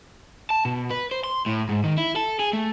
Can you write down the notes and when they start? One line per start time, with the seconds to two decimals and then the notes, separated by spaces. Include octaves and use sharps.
0.50 A5
0.65 B2
0.90 B4
1.11 C5
1.24 C6
1.46 A2
1.69 G#2
1.84 D#3
1.98 E4
2.16 A4
2.39 G#4
2.53 A3